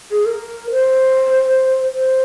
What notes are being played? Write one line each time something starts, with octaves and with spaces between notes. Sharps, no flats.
G#4
A#4
C5
C5